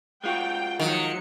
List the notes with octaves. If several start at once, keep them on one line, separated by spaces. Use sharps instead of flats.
G#3 F4 F#4 G5
D#3 F3 F#3 C#7